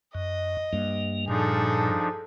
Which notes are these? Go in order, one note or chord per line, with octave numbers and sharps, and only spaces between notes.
F#2 D#5
G2 A#3
A#2 F3 D4 D#4 G#4 A4